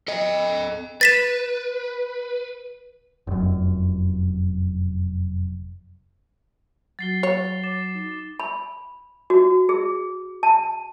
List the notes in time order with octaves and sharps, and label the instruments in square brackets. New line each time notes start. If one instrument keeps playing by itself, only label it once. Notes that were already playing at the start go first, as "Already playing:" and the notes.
[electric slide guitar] A4 D#5
[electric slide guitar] B4 [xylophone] A6 B6 E7
[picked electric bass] F1 F#2
[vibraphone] F#3 F#4 [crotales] A6 C7 G7
[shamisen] C#5
[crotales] D6 A6 E7
[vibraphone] D#4
[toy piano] B5
F#4
G#4
A5